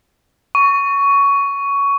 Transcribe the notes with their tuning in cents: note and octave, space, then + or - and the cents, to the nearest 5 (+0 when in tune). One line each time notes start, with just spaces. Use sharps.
C#6 +15